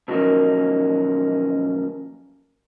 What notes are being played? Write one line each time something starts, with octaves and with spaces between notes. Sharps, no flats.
B2 D#3 F3 F#3 A#3 C#4